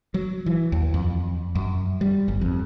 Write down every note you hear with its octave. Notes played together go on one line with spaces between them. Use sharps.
F#3
E3
D#2
F2
F#2
G3
G1
F2